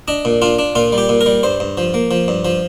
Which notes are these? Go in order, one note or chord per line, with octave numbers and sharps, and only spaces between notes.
D4 D#5
A#2
D4 F4
D4
A#2 F4
G3
G4
A#2
A#4
G3
G2 C5
G2
F3
A#3
F3
G2
F3